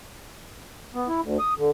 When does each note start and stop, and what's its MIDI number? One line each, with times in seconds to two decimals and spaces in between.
0.95 1.08 59
1.08 1.21 64
1.23 1.38 38
1.39 1.54 87
1.58 1.70 50